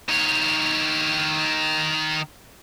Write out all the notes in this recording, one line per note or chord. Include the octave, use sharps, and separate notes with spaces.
D#3 C#5